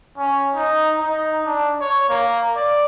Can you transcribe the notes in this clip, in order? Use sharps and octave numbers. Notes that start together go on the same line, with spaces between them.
C#4
D#4
D#4
D4
C#5
A#3
D5